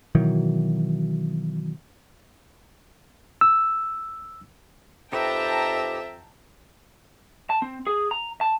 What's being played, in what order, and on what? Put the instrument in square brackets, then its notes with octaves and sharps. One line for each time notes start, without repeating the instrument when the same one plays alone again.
[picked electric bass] B2 D#3 E3 F#3
[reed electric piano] E6
[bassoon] F2 [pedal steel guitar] D#4 G4 B4 [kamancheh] E5 [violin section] G5 A5 A#5
[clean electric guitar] A5
C4
G#4
A#5
A5